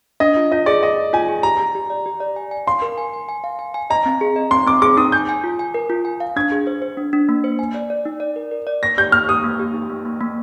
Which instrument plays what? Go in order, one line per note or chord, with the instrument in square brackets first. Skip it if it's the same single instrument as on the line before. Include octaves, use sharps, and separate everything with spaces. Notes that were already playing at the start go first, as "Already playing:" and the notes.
[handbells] D4 [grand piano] D#5
[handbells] F4
[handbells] F4 [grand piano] D#5
[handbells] G#4 [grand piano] D5
[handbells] G#4 [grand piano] D#5
[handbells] G#4
[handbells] F4 [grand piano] G#5
[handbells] G#4
[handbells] G4 [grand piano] A#5
[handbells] G4
G4
D5
G4
D5
G#5
G#5
[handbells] F5 [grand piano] C6
[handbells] A#4
G#5
G#5
G#5
F5
G#5
G#5
[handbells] D#5 [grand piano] A#5
[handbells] C4
G#4
D#5
[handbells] C4 [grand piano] C6
[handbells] C4 [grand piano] D6
[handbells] G#4 [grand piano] D6
[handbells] D#4 [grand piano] D#6
[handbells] G#5 [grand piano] G6
[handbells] G#5
F4
G#5
A#4
F4
G#5
F5
[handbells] D4 [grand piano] G#6
[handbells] G#4
C5
C5
D4
D4
A#3
C5
G#5
D5
D5
D#4
D5
A#4
A#4
D5
[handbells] A#3 [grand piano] A#6
[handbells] G4 [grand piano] G6
[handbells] A#3 [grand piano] F6
[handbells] G4 [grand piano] D#6
[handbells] A#3
G4
D#4
A#3
A#3
A#3